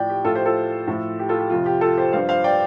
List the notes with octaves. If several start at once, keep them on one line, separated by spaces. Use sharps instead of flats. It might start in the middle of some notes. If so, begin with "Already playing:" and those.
Already playing: A2 F3 D5 G5
G4
A2 F3 F4 A4
G4 C5
F4 A4
A2 F3
G4
F4 A4
G4
F2 C3 F3 F4
G4
F4 A4
G4 C5
G2 F3 C5 F5
C5 F5
D5 G5